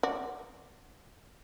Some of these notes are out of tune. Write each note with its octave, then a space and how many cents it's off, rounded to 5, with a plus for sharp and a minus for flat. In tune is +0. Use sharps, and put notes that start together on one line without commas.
F#4 +0 D5 +0